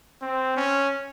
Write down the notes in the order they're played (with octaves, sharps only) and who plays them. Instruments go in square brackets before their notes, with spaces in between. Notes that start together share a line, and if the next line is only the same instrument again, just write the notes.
[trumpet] C4
C#4